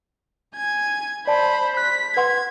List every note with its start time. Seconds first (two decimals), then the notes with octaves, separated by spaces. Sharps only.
0.55 G#5 G#6
1.27 C5 D5 A5 B5
1.77 F#6 B6
2.17 B4 F#5 C6 G#6